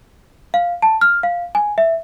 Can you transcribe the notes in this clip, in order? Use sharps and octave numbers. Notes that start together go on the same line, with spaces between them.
F5
A5
F6
F5
G#5
E5